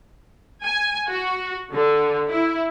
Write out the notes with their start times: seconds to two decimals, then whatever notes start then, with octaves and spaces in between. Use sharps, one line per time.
0.63 G#5
1.07 F#4
1.73 D3
2.29 E4